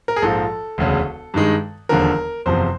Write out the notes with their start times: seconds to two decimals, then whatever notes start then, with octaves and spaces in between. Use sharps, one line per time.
0.08 A#4
0.16 G#4
0.22 A#1 G#2 F3 A4
0.78 E1 D2 C#3
1.34 G2 D#3 G#3
1.89 E1 D#2 D3 F3 A#4
2.46 F#1 E2 C3 F3 C5